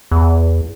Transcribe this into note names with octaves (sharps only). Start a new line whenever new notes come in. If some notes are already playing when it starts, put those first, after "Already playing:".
E2